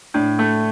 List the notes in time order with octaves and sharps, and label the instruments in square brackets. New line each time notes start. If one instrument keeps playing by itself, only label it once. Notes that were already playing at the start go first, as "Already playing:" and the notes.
[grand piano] A2 [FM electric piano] D4
[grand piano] A3